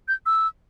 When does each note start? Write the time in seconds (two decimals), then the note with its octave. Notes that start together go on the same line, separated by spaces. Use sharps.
0.08 G6
0.26 E6